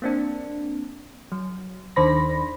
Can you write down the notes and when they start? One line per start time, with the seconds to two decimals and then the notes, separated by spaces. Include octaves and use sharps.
0.02 A#3 C4 D4
1.32 F#3
1.96 D#2 D#3 D4 C5 B5 A#6